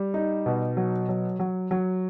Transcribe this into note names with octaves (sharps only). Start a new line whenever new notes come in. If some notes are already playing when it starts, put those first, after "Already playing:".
Already playing: G3
D#4
B2
F#3
F#3
F#3
F#3